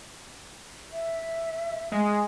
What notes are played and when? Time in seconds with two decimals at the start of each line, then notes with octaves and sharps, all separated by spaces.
0.92 E5
1.92 G#3